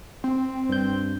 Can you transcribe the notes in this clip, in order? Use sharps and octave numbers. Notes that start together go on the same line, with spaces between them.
C4
G2 G6